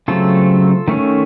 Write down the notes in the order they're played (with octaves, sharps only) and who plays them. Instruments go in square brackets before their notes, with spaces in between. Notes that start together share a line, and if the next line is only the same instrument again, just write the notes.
[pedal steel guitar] C#3 F#3 A3 C4 F4 A4
D#3 A3 C#4